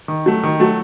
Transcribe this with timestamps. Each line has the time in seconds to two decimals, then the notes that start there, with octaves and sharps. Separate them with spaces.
0.08 D#3
0.26 F#3 A3
0.43 D#3
0.60 F#3 A3